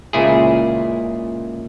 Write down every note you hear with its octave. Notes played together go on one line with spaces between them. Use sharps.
C#2 A#2 E4 G#4